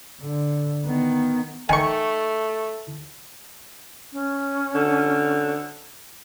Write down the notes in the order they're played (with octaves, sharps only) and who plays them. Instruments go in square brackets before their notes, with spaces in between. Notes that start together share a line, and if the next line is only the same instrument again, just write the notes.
[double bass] D3
D#3 B3
[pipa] D#3 C#6 [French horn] A3 [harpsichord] G#5
[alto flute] C#4
[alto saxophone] D3